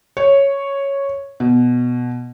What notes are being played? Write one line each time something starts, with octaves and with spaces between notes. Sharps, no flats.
C#5
B2